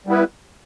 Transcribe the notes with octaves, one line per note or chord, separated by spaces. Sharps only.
G3 B3 E4 B4